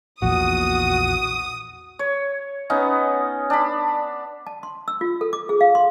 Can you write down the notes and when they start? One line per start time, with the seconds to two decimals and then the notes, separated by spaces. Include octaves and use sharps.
0.22 A#1 E2 A#2 F#4 D#6
1.99 C#5
2.70 B3 C#4 D#4
3.50 D4 B5
4.47 A5
4.63 C6
4.88 E6
5.01 F4
5.21 A4
5.33 D6
5.49 G#4
5.61 F5
5.75 C6